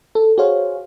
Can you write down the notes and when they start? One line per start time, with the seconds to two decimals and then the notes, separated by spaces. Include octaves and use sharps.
0.15 A4
0.38 F#4 G#4 C5 C#5 F5